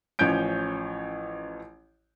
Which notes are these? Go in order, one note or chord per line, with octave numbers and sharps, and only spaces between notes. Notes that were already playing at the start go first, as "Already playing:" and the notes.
A1 F3 C#4 C#5 G6 D7